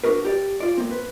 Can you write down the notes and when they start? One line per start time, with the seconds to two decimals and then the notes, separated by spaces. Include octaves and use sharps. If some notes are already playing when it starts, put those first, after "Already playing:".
0.04 D4 D#4 F#4 A#4 B4
0.25 G4 D5
0.60 F4 D5
0.78 A#3 C4
0.91 B4